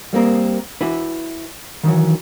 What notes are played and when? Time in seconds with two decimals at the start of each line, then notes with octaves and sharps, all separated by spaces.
0.13 G3 A#3 C4 A#4
0.81 E4 F#4 B4
1.83 D#3 E3 F#3